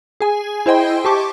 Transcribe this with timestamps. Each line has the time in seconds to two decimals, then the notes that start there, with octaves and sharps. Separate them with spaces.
0.20 G#4 G#5
0.66 E4 C5 D#5 G5 C6
1.05 G4 A5 C#6 D6